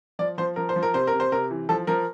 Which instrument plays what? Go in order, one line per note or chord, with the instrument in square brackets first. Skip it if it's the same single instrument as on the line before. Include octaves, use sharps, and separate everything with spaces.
[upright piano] F3 D5
F3 C5
F3 A#4
C5
F3
A#4
C3 C5
A#4
C3
C5
C3 A#4
E3
F3 A4
F3 A#4